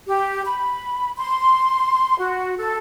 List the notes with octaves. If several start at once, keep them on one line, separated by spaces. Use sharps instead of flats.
G4
B5
C6
F#4
A4